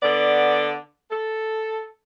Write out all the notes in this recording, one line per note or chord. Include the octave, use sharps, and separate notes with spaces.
D3 B3 D5
A4